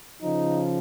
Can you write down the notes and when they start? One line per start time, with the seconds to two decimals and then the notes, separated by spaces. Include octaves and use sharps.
0.22 C#3 F3 D#4